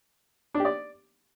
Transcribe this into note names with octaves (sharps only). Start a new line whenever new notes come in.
D4
G4
D5